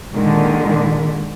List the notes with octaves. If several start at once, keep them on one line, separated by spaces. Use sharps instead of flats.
A#2 D3 D#3 G#3